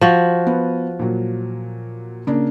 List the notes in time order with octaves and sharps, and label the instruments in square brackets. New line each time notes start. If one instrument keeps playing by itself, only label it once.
[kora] F3 F#4
[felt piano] B3
A#2 F#3
C#3 A#3 D4